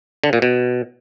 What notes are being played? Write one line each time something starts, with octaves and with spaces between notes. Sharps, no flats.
D3
A#2
B2